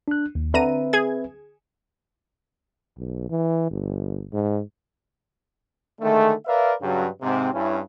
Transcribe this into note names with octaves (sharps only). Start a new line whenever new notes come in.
D4 F#6
D#2
D3 C4 B4 E5 A#5 D#7
G#4 G#6
B1
E3
G1
G#2
D3 D#3 G#3 A3
A#4 B4 D5 E5 F5
G2 C#3 F#3
G#2 C3 C4
G2 C#4 E4